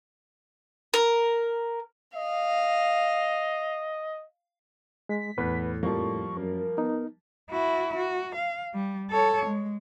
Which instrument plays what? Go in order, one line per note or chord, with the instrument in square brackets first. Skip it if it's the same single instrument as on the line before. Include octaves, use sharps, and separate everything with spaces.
[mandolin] A#4
[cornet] D#5 [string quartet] F5
[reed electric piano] G#3 [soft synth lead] B6
[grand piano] E2 [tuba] A2 [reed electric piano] B4
[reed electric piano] F2 [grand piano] F3 G3 A#3 [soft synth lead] C#6
[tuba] F#2 [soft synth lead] A#4
[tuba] B3 [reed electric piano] D#4
[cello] E4 F#4
F#4
F5
G3
A4 C#5
G#3